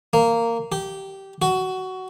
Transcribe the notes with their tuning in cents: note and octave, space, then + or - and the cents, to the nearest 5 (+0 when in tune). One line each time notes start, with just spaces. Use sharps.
A#3 -10
G4 -15
F#4 +15